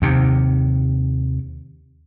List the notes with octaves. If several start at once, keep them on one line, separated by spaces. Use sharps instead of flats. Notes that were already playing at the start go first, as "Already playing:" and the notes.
D#2 C3